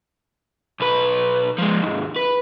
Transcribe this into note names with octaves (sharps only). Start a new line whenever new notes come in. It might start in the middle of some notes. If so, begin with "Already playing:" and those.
B1 B4
F3 G#3
D#2 G#2
B4